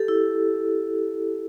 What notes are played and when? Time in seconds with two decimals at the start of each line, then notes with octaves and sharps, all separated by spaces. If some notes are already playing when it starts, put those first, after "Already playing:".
Already playing: G4 A4
0.08 E4